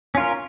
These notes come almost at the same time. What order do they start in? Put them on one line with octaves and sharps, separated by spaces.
C#4 F4 A#4